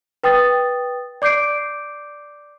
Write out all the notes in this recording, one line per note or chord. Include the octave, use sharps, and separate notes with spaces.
B4 G5 D#6 A6
D5 D6 G6 C7 D7